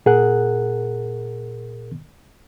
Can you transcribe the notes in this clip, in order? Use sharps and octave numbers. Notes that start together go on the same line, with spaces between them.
A#2 G#4 A#4 F#5 F#6